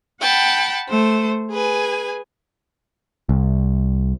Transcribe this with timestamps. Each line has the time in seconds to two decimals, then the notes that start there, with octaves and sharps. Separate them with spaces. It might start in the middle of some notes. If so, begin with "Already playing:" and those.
0.21 F#5 G5 A5 B5
0.88 A3 C5
1.51 G#4 B4 G#5
3.29 C2